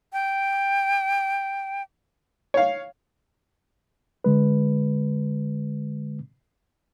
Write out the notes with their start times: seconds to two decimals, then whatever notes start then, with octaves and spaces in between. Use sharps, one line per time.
0.13 G5
2.54 C#5 F5
4.24 D3 G#3 B4